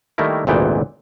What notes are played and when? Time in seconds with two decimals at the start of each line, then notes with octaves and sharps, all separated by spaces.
0.18 D#3 G3 A3 A#3 E4 A#4
0.47 G#1 D2 A#2 E3 B3 G5